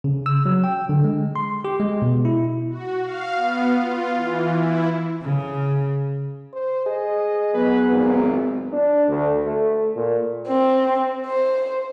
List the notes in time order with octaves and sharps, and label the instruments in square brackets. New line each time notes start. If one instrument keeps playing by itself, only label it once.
[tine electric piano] C#3
E6
F#3
G5
D3
G#3
C6
G4
G#3
B2
E4
[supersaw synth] F#4
F5
B3
F4
E3
E4
[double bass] C#3
[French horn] C5
[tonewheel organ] G#4 [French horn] D#5
[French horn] F#3 [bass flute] B3 [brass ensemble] B4
[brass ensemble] G#1 A#2
[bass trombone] D4
D2
A3
A#2
[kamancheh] C4
C5